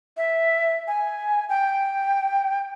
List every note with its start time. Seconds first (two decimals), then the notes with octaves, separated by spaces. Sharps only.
0.17 E5
0.87 G#5
1.49 G5